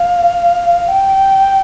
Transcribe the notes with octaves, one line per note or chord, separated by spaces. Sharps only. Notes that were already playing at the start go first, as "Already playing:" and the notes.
Already playing: F5
G5